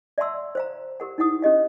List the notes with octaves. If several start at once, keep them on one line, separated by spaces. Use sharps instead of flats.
D5 E5 F#5 A5 C6 E6
C5 F5 A#5
G4 A#4 F#5
D#4 E4 F#5 D#6
C#4 G4 D#5 F5